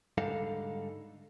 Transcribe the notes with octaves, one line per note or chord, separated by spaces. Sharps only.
G#2 D3 G3 D#4 A4 F5